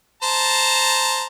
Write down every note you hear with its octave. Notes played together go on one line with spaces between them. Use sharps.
C5 A5 A#5